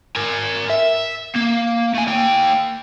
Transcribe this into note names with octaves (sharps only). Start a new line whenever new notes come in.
A#4 G#5
E5
A#3
A3 G#5
A#3 G5